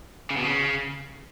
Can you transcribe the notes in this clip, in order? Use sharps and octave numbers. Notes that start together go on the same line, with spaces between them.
C#3
B2
C#3